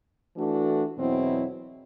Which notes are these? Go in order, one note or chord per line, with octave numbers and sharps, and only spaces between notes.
E3 A3 D4 F#4 A4
E2 B2 F#3 C4 E4